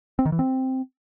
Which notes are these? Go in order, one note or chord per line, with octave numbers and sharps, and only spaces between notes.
C4
D#3
E3
C4